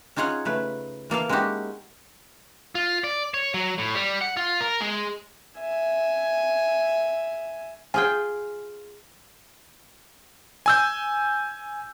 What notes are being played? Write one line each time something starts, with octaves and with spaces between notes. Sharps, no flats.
C#4 D#4 F4 G#4 C#5 F#5
C#3 A3 B4
E3 A#3 A4 F5
G#3 C#4 D#4 E4 F#4 G4
F4
D5
C#5
F#3
A2
G3
F#5
F4
A#4
G#3
E5 G#5
F4 G#4 G5 G#5
G#5 E6 G6